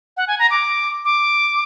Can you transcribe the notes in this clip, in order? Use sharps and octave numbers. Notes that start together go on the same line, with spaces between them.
F#5
G#5
A#5
D6
D6